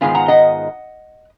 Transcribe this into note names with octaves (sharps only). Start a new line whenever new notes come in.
G#2 D#3 G#3 B3 F4 F5 G#5
F#5 A#5
D#5 F#5